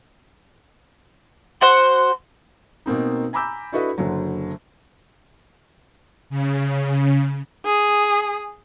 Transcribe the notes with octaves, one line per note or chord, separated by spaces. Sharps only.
F#4 C5 F#5 C6
B2 A#3 C4 D#4
G#5 A#5 B5 D6 E6 G6
D4 E4 F#4 A4 B4 D#5
F#1 D3 F#3
C#3
G#4